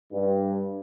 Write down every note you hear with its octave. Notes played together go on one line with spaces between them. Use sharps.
G2